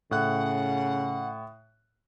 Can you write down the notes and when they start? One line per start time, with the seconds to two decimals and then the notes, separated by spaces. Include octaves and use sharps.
0.11 A2 C#3 F#5 F#6